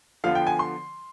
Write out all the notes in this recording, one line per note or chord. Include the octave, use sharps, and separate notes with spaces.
D3 F3 B3 F4 F5
G5
G#5
C6